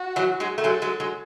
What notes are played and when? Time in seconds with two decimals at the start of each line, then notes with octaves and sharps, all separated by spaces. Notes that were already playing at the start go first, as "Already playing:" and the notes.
Already playing: F#4
0.16 E3 F#3
0.40 F#3 G#3
0.58 A3
0.64 F#3 G#3 A4
0.82 F#3 G#3
1.00 F#3 G#3